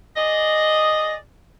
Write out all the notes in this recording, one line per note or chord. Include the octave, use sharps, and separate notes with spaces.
G#4 D5 D#5